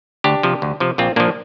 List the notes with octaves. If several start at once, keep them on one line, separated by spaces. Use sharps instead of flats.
D2 D4 G4
C3 F3
D2
C3 F3
A#1 C4 F4
A#2 F3 A#3 D4